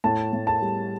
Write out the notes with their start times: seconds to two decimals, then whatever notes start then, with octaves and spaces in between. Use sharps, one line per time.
0.04 A2 A5
0.33 A2
0.47 A5
0.62 G3